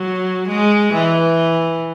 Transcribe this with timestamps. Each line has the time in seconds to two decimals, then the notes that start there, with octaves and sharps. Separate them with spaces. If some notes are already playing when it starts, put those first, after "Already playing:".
Already playing: F#3
0.48 G#3
0.93 E3